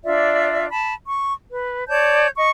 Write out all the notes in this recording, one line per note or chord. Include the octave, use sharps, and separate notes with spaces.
D4 F4 D5 E5
A5 B5
C#6
B4
C#5 D5 A5 G6
D#5 C#6